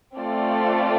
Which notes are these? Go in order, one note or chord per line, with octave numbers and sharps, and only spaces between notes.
A3 C4 F4 A4 D5